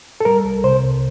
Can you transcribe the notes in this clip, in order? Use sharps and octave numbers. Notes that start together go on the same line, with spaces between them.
A4
G3 A#4
C2
C3 C5
C2